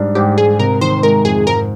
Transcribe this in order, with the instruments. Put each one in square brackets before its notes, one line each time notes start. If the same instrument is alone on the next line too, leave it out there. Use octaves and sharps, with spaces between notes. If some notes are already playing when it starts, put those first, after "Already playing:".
Already playing: [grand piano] G#2 G3 D4
[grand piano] G#2 [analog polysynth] G4
[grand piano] G#2 [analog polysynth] G#4
[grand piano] C3 [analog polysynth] A#4
[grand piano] D#3 [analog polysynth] C5
[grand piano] G#3 [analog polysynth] A#4
[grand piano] F2 [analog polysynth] G#4
[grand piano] G#2 [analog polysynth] A#4